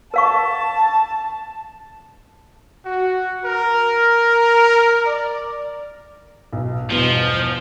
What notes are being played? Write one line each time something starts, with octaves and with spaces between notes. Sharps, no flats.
A#4 F5 A5 C#6
F#4
A#4
D5
B1
E2 G2 B2 F3